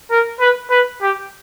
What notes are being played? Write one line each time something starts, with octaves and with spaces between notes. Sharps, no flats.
A#4
B4
B4
G4